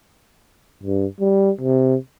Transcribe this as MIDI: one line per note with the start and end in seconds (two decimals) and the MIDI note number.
0.83 1.06 43
1.20 1.51 55
1.61 1.96 48